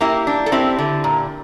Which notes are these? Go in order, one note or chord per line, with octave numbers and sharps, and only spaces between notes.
A#3 E4 G4
D4
A4
C4 E4 G4
D3
A#2